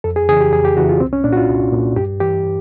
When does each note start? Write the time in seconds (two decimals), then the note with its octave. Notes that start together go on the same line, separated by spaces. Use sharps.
0.04 F2 A4
0.16 G#4
0.29 C#3 E3 G#4
0.41 G4
0.52 F2 G#4
0.65 G4
0.77 C#3 E3 F#4
0.89 F4
1.00 C2 C4
1.13 C#4
1.24 A#2 D4
1.33 F#4
1.37 F4
1.49 C2
1.73 A#2
1.96 G2 G4
2.21 E3 G4